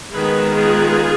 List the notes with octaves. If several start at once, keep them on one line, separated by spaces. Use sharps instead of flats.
D#3 G#3 B3 G#4 B4
F4 G#4